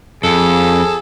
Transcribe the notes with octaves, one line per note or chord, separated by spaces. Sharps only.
F2 G#4 A4